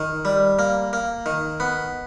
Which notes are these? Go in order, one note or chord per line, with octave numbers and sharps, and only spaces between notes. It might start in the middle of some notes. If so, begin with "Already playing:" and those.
Already playing: D#3
G3
A#3
A#3
D#3
B3